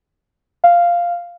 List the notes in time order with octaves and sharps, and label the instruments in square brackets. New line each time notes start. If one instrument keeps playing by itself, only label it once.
[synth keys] F5